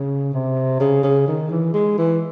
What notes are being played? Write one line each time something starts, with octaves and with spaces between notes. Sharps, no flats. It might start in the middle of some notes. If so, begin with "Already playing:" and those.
Already playing: C#3
C3
C#3
C#3
D#3
E3
G#3
E3